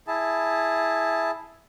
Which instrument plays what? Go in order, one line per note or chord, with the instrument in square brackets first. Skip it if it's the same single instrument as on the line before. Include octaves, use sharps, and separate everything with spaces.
[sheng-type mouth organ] E4 G#4 A5